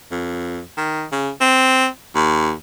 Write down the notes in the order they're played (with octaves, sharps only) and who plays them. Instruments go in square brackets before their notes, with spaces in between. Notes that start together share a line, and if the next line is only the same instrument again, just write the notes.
[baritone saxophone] F2
D#3
C#3
C4
D#2